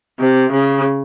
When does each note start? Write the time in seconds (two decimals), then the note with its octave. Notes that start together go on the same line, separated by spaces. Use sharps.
0.20 C3
0.52 C#3